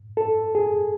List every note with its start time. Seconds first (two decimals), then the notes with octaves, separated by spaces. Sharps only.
0.17 A4
0.55 G#4